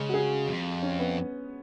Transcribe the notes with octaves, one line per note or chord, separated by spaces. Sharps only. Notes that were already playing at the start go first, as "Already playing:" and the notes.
Already playing: C#3 G#3
F#4
G#4
F2
C#4
B3